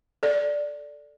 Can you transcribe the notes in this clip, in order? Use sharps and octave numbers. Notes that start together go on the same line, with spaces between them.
A4 D5